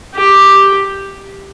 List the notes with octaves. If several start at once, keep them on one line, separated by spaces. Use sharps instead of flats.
G4